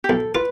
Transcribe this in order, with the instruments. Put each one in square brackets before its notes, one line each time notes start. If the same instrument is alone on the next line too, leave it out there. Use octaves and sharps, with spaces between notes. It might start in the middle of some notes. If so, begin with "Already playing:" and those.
[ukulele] G4
[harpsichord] B1 [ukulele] A4
[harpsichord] F4 [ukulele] B4